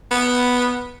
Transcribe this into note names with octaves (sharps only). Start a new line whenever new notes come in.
B3